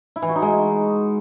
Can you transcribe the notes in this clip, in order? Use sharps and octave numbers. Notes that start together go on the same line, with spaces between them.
E4
E3
F#4
D#4
G#3